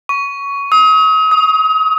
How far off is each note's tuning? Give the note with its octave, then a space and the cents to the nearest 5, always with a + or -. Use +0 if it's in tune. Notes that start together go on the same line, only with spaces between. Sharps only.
C#6 +15
D#6 +40
D#6 +15